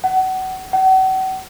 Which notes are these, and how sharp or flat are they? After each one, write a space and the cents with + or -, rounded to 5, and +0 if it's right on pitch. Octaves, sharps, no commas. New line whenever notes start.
F#5 +25
F#5 +40